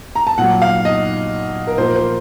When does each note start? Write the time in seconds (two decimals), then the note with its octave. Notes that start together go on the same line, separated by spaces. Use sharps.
0.16 A#5
0.27 A5
0.38 A#2 F#3 F#5
0.62 F5
0.85 D#5
1.67 A#4
1.78 A#2 F3 C5
1.88 A#4
1.95 C5